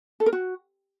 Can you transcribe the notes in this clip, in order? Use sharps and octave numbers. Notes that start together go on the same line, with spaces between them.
A4
A#4
F#4